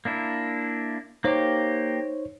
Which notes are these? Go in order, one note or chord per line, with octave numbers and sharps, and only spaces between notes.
A#3 D4 E4
A#3 D#4 G4 C5 C#5